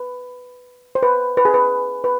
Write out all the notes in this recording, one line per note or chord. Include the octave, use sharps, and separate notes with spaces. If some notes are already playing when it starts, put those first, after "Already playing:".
Already playing: B4
C5
B4
B4
G#4
B4
B4